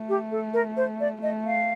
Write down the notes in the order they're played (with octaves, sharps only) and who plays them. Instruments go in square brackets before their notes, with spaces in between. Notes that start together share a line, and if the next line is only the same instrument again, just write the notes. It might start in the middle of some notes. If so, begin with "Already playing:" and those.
Already playing: [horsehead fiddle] A3
[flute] G4
A4
A#4
C5
D5
[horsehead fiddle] A3 [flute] D#5
[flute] F5